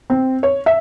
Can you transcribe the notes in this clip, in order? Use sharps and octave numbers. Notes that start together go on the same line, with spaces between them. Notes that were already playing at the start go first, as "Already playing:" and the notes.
C4
C#5
E5